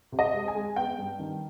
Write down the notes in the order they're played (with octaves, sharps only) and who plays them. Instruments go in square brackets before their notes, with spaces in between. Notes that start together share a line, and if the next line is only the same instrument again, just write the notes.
[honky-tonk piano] C3
D#5
G#3
G#5
G#3
B3 G5
G2
D#3